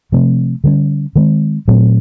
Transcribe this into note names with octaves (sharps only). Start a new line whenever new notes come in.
C3 F3 A3 C4
D3 G3 A#3 C#4
D#3 G#3 C4
A#2 F#3 A3 C4